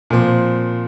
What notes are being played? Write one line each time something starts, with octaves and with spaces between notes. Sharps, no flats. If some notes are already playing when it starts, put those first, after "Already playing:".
A#2 F3 C4